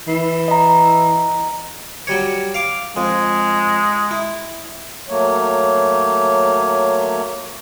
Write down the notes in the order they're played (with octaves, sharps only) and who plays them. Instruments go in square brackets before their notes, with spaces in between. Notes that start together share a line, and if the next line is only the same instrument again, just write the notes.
[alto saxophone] E3
[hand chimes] D#5 A#5
[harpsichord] F#3 G3 C#5
F5 D6
[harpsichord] F2 [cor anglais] G#3
[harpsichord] E4
[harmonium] F#3 A3 A#3 C#5